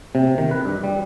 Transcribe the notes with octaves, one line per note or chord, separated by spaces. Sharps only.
C3
D#3
B4
G2
G3